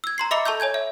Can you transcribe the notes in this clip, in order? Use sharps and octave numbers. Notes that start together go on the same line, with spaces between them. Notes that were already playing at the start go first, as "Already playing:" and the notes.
E6 G#6
A#5 C6 C7
D#5 E5 B5 D6 E6 C#7
A4 A5 C#6 E6 G6
C#5 G#5 G6 G#6
E5